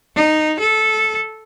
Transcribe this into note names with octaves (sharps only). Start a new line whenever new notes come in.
D#4
A4